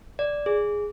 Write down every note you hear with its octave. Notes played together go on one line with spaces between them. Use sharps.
D5
G#4